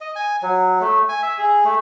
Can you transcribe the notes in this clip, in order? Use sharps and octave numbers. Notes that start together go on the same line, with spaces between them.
D#5
G#5
F#3
A3
G#5
E5
G#4
A3